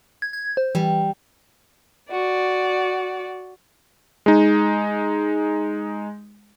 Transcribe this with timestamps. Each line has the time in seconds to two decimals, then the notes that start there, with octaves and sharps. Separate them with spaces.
0.22 G#6
0.33 G#6
0.57 C5
0.75 E3 G3
2.11 F#4 D5
4.26 G#3 D#4